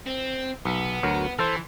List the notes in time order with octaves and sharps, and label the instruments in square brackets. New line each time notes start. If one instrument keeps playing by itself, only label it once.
[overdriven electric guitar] C4
[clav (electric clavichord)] B1 [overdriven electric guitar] B3
[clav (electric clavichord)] D2 F#3 A#4
[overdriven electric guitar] E3 [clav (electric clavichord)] A4 C5